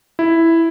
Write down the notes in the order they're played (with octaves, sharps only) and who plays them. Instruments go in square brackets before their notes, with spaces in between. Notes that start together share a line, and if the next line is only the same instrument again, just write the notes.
[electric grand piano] E4